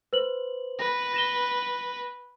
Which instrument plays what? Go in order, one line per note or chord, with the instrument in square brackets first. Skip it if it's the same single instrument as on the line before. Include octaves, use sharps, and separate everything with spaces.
[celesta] B4 C5 F#7
[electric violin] B4 [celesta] A#6
[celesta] A#6 E7 G7